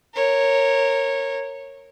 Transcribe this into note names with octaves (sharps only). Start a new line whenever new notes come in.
A#4 C#5